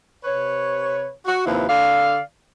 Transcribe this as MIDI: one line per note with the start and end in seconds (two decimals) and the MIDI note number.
0.25 1.08 48
0.25 1.08 71
0.25 1.08 73
1.26 1.41 66
1.45 1.64 39
1.45 1.64 48
1.45 1.64 53
1.45 1.64 64
1.45 1.64 71
1.68 2.19 50
1.68 2.19 69
1.68 2.19 74
1.68 2.19 77